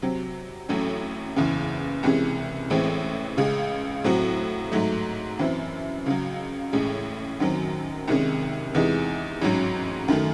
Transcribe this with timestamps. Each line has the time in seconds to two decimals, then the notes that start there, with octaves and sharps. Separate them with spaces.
0.02 C3 F#3 C4
0.69 A1 A2 F#3 A3 C#4
1.36 F#1 E2 C#3 E3
2.03 C2 C3 E3 G#3 C#4
2.70 A1 A2 E3 G#3 C4
3.37 C#2 C#3 G#3
4.04 A2 F#3 C4 F#4
4.72 G#2 F#3 A3
5.39 F#2 E3 C4 E4
6.06 C#2 C#3 F#3
6.73 A1 A2 G#3 C#4
7.40 F#2 D#3 F#3 C4
8.08 C2 C3 D#3 G#3 C#4
8.75 E2 C3 E3 G#3 D#4
9.41 A1 G#2 F#3 C#4
10.08 F#2 D#3 A3